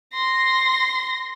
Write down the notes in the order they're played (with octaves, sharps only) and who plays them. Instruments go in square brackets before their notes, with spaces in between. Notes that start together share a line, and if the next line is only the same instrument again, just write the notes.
[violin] C6 A#6